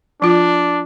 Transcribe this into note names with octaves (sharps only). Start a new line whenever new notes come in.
F3 D4 F4